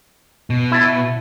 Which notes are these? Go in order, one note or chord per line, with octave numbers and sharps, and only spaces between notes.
B2
E4 A5